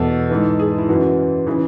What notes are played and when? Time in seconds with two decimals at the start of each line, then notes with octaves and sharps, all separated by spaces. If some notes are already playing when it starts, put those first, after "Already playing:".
Already playing: E2 B2 A4
0.30 G#2 E3
0.59 G#4
0.78 E4
0.89 F#2 E3 F#4
1.46 C#3 E3